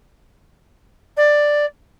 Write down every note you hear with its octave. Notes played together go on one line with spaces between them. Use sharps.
D5